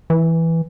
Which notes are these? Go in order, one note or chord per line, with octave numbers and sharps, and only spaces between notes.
E3